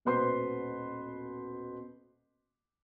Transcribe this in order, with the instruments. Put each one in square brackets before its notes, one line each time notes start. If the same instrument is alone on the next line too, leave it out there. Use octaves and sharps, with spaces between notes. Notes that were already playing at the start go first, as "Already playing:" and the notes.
[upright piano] D#1 B2 B4 C5 C6 C7